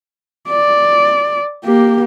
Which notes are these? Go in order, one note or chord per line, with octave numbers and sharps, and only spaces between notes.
D5
A#3 G4